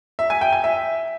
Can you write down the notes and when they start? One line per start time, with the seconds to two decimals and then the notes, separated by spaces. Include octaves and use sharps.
0.19 E5
0.30 G#5
0.41 G5
0.53 G#5
0.64 E5